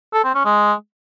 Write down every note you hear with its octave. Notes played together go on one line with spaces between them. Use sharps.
A4
C4
C#4
G#3